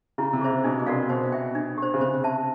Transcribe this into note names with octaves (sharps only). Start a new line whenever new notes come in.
C#3 E4
C3
G#4 C5 E5
B2 D4
B2
C3 F#4 A#4 D5 F5
B2 C5
E5 G5
D4
G4 C5
C#3
C3 C5
E5 A5